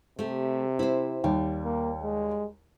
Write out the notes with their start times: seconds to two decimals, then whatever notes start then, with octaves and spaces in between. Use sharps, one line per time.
0.19 C3 A3 G4
0.79 C4 E4 C5
1.24 D#2 G3
1.65 A#3
2.03 G#3